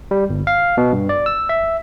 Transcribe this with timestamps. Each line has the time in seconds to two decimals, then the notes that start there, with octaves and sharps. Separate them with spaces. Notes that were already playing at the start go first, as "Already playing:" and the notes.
0.11 G3
0.29 G1
0.47 F5
0.77 B2
0.92 G2
1.09 D5
1.26 E6
1.49 E5